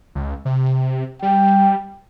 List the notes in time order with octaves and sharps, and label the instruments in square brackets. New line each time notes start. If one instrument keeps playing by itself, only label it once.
[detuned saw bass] C#2
C3
[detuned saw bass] G3 [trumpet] G5